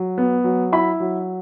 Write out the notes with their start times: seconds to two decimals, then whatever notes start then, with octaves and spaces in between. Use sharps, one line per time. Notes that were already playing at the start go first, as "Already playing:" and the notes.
Already playing: F#3
0.18 B3
0.44 F#3
0.72 E4 B5
1.00 F#3